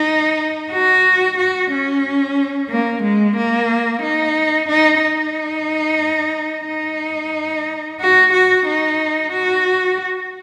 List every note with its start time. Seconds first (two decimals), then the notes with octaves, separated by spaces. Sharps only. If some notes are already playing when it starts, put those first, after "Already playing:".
Already playing: D#4
0.72 F#4
1.38 F#4
1.71 C#4
2.70 A#3
3.03 G#3
3.37 A#3
4.03 D#4
4.69 D#4
5.02 D#4
6.67 D#4
8.01 F#4
8.33 F#4
8.66 D#4
9.32 F#4